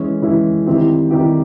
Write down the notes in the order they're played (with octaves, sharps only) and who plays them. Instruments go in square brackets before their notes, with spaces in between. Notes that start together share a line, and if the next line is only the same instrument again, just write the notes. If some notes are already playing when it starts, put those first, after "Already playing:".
Already playing: [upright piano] E3 G#3 C#4 E4
E3 G#3 C#4 E4
D#3 G3 C4 E4 G4
D#3 G3 C4 E4 G4